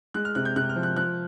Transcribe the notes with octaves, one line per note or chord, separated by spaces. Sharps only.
G#3 F#6
F6
C3 F#6
G6
C3 F#6
F6
F3
F#6
F3 F#6